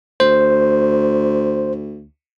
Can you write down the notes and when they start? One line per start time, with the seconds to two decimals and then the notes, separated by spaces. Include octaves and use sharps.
0.20 D2 C5